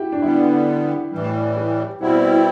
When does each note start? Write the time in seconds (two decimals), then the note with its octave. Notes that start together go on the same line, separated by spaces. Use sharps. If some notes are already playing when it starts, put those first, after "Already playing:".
Already playing: E4 F#4 G4
0.12 D4
0.22 D3 G3 B3 E4
1.11 A2 E3 G3
1.57 G4
2.01 B2 G3 C4 E4 F#5